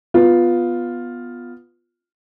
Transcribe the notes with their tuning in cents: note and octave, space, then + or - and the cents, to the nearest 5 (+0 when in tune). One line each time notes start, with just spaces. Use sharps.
B3 +0 F4 +5